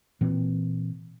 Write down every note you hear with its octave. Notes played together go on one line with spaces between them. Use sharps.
A#2 E3 C4